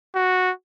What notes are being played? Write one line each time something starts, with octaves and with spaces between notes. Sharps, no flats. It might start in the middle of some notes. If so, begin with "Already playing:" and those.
F#4